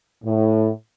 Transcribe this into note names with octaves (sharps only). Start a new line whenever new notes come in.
A2